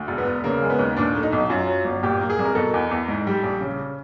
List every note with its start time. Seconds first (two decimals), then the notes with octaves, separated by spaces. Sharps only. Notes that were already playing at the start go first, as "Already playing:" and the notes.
Already playing: D2
0.08 E1
0.18 B3
0.27 E1
0.44 C#3 A#3
0.62 G#3
0.70 B3
0.79 D#2
0.96 A#2 D4
1.15 A3
1.23 D#4
1.33 B1
1.50 F#2 F4
1.67 F#3
1.85 G1
2.03 A#2 G4
2.20 A#3
2.30 G#4
2.39 C2
2.45 A#4
2.55 B2 A4
2.74 E2
2.91 E2
3.08 G#2
3.27 G3
3.43 A#1
3.61 C#3